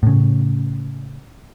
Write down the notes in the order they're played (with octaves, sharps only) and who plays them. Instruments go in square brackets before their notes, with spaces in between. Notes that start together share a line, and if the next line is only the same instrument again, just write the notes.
[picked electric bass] A2 C#3